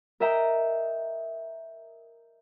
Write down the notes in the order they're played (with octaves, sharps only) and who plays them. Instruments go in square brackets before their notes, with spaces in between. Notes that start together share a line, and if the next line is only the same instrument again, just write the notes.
[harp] A#4 D#5 E5 G5 A#5